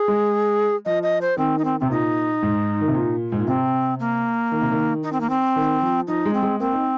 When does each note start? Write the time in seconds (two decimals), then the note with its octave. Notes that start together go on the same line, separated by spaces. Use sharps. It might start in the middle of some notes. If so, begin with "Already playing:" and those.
Already playing: G#4
0.08 G#3
0.85 F3 D#5
1.03 D#5
1.21 C5
1.37 D#3 C4
1.59 D#4
1.65 C4
1.80 C3 C4
1.90 A#2 D#4
2.42 G#2
2.81 D#3
2.88 C3
2.95 A#2
3.32 G#2
3.39 A#2
3.47 C3 C4
4.00 A#3
4.52 D#3
4.61 C3
4.71 D#3
5.03 D#4
5.13 C4
5.21 A#3
5.30 C4
5.56 D#3
5.82 F3
6.07 F3 D#4
6.25 G#3
6.34 C4
6.43 G#3
6.60 A#3 C4
6.73 D#4